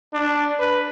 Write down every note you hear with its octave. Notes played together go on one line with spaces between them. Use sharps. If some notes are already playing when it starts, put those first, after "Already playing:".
D4
B4